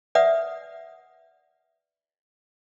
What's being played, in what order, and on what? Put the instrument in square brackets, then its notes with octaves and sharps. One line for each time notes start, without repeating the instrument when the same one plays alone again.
[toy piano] B4 D5 E5 F#5 D#6